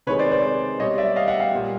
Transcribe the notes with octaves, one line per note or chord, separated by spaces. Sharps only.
C3 D#3 G#3 B4 C#5
C5 D5
C5 D5
B2 G3 C#5 D#5
D5 E5
D#5 F5
E5 F#5
F5 G5
A#2 G3